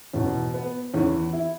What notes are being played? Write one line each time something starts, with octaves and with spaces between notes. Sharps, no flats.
E2 B2 C#4
B3
E2 E3 C#4
E4